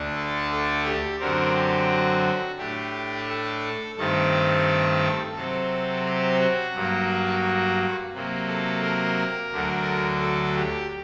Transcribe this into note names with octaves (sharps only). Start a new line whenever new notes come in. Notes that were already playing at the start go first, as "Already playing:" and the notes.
Already playing: D2 D3 A3 D4
A4
A4
G4
F#2 D3 F#3 C4 A#4
G4
F#4
A2 A3 D4 G4
A4
G2 D#3 A3 C4 A4
C3 F#3 C4 A4
G4
F#4
G2 F#3 A#3
C3 F#3 A#3
A4
A#4
D2 D3 F#3 A3
A4
G4